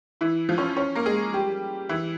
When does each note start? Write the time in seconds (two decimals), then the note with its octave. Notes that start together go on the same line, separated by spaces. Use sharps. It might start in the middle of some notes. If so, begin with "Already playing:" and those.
0.21 E3 E4
0.49 F3 F4
0.58 C#4 C#5
0.76 C#4 C#5
0.95 A#3 A#4
1.06 G#3 G#4
1.34 G3 G4
1.89 E3 E4